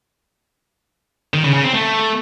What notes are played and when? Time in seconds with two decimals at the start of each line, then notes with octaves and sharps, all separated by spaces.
1.34 D#3
1.44 C#3
1.54 C#3
1.64 C4
1.74 A3